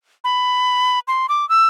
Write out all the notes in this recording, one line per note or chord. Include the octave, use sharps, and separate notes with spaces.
B5
C6
D6
E6